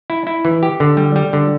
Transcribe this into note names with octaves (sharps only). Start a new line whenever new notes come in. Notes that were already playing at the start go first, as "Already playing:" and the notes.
E4
E4
E3
G4
D3
G3
G3
D3